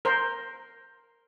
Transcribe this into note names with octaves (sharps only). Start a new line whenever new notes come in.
A#4 C5